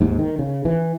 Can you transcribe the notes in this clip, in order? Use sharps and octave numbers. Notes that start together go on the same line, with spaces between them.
D#2 G#2
D#3
C#3
E3